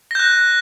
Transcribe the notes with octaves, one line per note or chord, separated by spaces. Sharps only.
F#6 G6 A#6